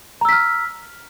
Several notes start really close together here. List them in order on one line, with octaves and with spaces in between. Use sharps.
A#5 E6 B6 F6